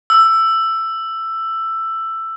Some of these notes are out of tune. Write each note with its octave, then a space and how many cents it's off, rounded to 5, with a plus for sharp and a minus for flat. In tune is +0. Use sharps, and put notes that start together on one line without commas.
E6 +10